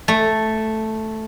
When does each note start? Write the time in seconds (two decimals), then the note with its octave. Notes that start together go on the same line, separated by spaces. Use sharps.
0.08 A3